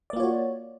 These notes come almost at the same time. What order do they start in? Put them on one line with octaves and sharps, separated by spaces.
D5 A#3 F4 C#5 F#4